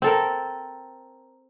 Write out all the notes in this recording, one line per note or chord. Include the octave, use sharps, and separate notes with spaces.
C4 A4 A#4